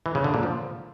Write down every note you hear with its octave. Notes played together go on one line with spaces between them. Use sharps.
E3
C#3
D3
A#2
F3